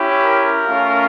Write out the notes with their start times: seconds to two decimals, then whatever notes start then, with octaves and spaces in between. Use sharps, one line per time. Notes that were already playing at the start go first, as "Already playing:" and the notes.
Already playing: C#4 E4 G4
0.23 A#4
0.66 A3 C#4 F4